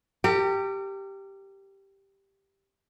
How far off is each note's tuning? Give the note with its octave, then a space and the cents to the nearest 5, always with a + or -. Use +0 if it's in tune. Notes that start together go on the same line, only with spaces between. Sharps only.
G4 +0 A#4 -40